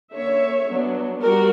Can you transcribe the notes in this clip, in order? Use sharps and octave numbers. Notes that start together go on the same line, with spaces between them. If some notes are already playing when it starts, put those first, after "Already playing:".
D3 A#3 C#4 C#5 E5
F#3 B3 D4
G3 F#4 A#4